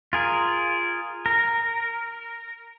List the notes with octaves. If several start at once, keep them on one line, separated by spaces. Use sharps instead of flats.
F4 G#4 A#4
A#4